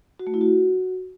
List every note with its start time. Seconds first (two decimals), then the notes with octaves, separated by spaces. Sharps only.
0.19 F#4
0.27 A3
0.34 E4
0.41 F#4